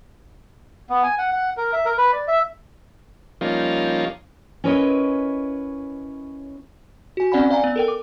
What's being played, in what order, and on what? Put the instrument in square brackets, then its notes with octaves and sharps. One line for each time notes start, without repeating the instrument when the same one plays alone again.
[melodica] B3
G#5
F#5
F#5
A#4
E5
A#4
B4
D5
E5
[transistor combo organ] F3 G3 A#3 C#4 D#4 F4
[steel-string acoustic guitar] C#4 E4 A#4 B4 C#5 D#5
[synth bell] F#4 G#5
C4 C#4 D5 F#5 G#5 B5
D5 F5 G#5 A#5
B3
A4 A#4 G5
D6